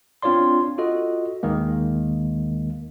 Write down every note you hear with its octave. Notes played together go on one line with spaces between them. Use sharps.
C4 D4 F4 C#5 D5 C6
F4 F#4 A4 D#5
D#2 D#3 G#3 A#3